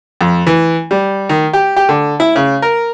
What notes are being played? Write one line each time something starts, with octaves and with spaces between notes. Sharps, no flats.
F2
E3
G3
D#3
G4
G4
D3
E4
C#3
A#4